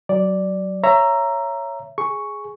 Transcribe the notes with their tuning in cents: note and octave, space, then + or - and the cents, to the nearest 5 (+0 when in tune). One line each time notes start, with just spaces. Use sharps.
F#3 +25 D5 +0
C#5 +0 E5 +25 A#5 +0
G#4 +0 C#6 +0